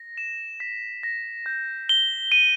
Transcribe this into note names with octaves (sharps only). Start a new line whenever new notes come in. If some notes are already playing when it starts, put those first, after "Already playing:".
Already playing: A#6
E7
B6
A#6
G6
G7
D#7